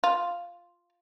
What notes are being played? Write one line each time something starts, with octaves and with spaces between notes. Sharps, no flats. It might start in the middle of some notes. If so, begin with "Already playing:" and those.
F4